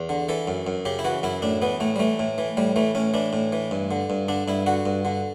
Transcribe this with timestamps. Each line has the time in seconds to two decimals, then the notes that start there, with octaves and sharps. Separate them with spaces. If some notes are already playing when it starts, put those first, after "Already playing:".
Already playing: E2
0.09 D3
0.29 E3 A4
0.48 F#2
0.67 F#2
0.85 C#3 G4
0.99 E4
1.04 E3 F#4
1.23 F#2 E4
1.42 A2 D4
1.62 E3 B3
1.80 A2 A3
1.96 G3
2.00 E3 A3
2.19 A2
2.38 E3
2.57 A2 G3
2.76 E3 A3
2.95 A2 C#4
3.14 E3 D4
3.33 A2
3.53 E3
3.71 G2
3.91 D3
4.10 G2
4.28 D3 D4
4.48 G2 E4
4.66 D3 F#4
4.86 G2
5.05 D3